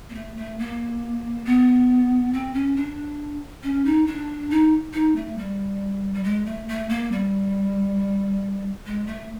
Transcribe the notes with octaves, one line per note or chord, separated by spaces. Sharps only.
A#3
A3
A3
A#3
B3
C4
C#4
D4
C#4
D#4
D4
D#4
D#4
A3
G3
G3
G#3
A3
A3
A#3
G3
G#3
A3